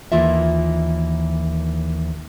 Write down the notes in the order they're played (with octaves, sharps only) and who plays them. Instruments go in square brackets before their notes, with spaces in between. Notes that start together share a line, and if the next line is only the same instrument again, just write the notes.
[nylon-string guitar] D#2 E3 A#3 F4 E5